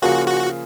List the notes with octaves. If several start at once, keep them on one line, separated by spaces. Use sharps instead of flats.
C#3 F3 A#3 F4 F#4 G#4
F#4